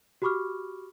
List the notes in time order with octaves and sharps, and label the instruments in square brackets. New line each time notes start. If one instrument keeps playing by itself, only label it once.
[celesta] F#4 G4 B5 C#6 D6 F6